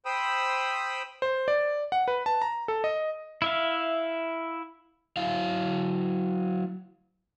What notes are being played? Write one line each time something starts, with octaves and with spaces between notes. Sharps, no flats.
C5 G5 B5 D#6 E6
C5
D5
F#5
B4
A5
A#5
A4
D#5
E4 E5 F5
F#3 E4 F5